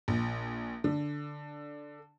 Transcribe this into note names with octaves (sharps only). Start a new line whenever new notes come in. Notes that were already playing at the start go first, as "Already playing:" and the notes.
A#1
D3